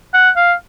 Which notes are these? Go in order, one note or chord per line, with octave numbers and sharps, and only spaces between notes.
F#5
F5